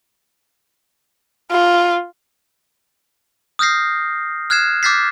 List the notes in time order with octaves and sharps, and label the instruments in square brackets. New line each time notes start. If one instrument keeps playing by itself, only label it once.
[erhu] F4
[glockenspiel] D#6 F6 G6 A#6 C7
F6 F#6 G#6 C7 E7
D6 F6 G6 A6 B6 C7